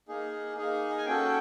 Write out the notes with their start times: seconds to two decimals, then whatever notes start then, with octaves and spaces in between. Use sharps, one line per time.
0.08 A#3 D#4 G#4
0.57 A#3 D#4 G#4
0.98 G#5
1.06 C#4 F#4 A4 G5